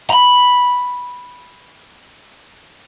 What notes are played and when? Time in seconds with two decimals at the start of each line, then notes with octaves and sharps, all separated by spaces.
0.10 A#5 B5